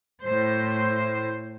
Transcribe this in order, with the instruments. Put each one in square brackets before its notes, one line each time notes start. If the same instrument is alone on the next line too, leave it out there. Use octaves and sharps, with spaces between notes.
[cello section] A2 C5